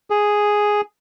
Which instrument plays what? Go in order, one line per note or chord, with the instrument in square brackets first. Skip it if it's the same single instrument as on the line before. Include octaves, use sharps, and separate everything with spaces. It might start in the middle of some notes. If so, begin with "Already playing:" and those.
[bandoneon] G#4